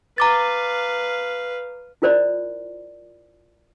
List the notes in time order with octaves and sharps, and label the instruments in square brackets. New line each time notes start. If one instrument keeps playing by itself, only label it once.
[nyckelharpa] B4 F5 [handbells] A#5 D6 A6
[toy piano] E4 F4 A#4 C5 D5 B5